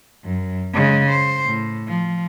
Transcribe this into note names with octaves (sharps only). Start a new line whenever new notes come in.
F#2
C#3 G#3
C5
A2
F3